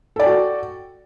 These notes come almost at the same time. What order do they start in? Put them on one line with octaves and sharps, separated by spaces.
A4 D5 G5 F#4